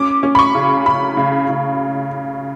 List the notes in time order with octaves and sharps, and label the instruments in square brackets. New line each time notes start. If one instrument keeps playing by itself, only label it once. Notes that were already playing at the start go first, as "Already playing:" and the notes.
Already playing: [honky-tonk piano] C#4 D6
C#4
B5
C#6
C#3
C#3 B5
C#3
C#3